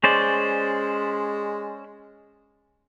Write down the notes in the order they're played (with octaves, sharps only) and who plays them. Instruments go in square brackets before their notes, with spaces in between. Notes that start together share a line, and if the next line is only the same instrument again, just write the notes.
[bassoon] G#3 [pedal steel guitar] C#4 C5 D5